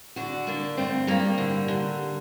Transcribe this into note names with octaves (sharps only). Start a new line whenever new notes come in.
D3 D4 F#4
D3 A#3 D4
G2 A3 C4
G2 G3 A#3
D3
D3